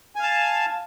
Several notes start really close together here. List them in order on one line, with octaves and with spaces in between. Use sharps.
G#5 F5 A5